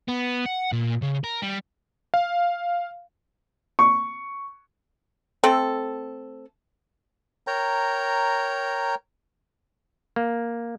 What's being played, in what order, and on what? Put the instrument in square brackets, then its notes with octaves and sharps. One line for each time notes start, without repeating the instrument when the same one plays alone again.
[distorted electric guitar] B3
F#5
A#2
C#3
A#4
G3
[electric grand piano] F5
[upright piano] C#6
[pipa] A3 C4 A4
[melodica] A#4 C#5 G5 A#5
[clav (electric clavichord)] A#3